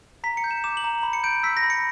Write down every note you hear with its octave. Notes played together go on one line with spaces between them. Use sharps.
A#5 B6
C#7
G6
E7
D6 E7
F#7
A#5
B5
C#7
G6 D7
E6 B6
A#6
B5
C#7